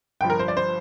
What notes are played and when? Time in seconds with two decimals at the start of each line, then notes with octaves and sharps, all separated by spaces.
0.21 G1 G2 F3 G5
0.30 A#4
0.39 C5
0.48 D5
0.57 C5